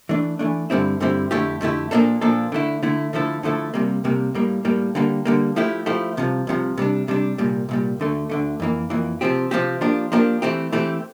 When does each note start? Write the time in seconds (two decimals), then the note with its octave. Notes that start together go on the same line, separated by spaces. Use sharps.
0.09 E3 A3 D4
0.39 E3 A3 D4
0.70 G2 D3 G3 C4 E4
1.00 G2 D3 G3 C4 E4
1.31 F2 D3 A3 E4 G4
1.61 F2 D3 A3 E4 G4
1.91 A#2 F3 A#3 D4 A4
2.21 A#2 F3 A#3 D4 A4
2.52 D3 A3 E4
2.83 D3 A3 E4
3.13 D3 F3 A3 E4 A4
3.43 D3 F3 A3 E4 A4
3.74 C2 C3 G3 A#3
4.04 C2 C3 G3 A#3
4.35 A2 G3 A#3
4.65 A2 G3 A#3
4.95 D3 G3 A#3
5.25 D3 G3 A#3
5.56 F3 A3 E4 G4
5.86 F3 A3 E4 G4
6.17 C2 C3 F3
6.47 C2 C3 F3
6.78 C3 G3 D4
7.08 C3 G3 D4
7.38 C2 A#2 G3
7.69 C2 A#2 G3
8.00 D2 D3 A3
8.30 D2 D3 A3
8.60 F2 E3 A#3
8.90 F2 E3 A#3
9.21 C3 F3 C4 G4
9.51 C3 F3 C4 G4
9.81 F3 A#3 D4 G4
10.12 F3 A#3 D4 G4
10.42 E3 A3 C4 G4
10.72 E3 A3 C4 G4